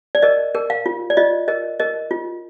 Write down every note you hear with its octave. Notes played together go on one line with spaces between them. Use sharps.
D5
A#4 D#5
A#4
F5
F4
D5
F4 D#5
A#4 D#5
A#4 D#5
F4